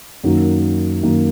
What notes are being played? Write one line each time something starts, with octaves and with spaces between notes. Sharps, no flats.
F#2 D#3 F#3 A#3 D#4
F#2 D#3 F#3 A#3 D#4